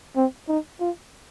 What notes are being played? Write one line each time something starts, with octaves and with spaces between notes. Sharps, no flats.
C4
D#4
F4